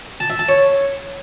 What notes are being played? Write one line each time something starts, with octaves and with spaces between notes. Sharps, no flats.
A5
E5
A5
C#5